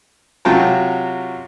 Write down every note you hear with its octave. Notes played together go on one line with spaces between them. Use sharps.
C3 F#3 F4 F#4 G5 A5